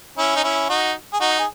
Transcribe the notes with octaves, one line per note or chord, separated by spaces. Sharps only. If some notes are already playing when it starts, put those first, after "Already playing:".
C#4 E4
D#4
C#4 E4
D#4 F#4
G#4
D#4 F#4
G#4